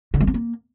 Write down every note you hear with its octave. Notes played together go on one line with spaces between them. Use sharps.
D3
G#3
B3
A#3